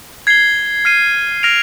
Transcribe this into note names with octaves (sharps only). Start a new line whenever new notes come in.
G#6 C7 G7
F6 C7 D#7
F6 A#6 D7 F7